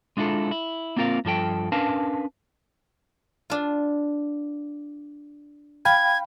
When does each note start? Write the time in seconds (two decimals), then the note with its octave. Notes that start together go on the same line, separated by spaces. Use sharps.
0.17 G#3 D4 E4 F4 A4
0.51 E4
0.97 A#3 C4 F4 A#4 F5
1.25 G2 F3 A4 G5
1.72 C#4 D4 A#4 B4 F5 A5
3.50 D4 F4
5.85 F5 G5 B5 G#6